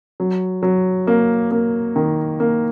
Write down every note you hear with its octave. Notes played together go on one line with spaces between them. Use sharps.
F#3
F#3
A#3
A#3
D#3
A#3